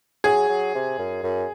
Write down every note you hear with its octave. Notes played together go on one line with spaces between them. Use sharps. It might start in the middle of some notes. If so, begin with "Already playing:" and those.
F#3 G#4
F#3
C3
F#2
F#2